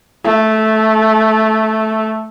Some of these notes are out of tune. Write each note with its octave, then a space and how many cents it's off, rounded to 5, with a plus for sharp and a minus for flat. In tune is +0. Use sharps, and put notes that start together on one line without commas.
A3 -10